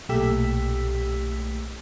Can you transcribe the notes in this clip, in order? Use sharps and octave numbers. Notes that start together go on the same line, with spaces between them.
B1 A#2 A3 G4 E6 B6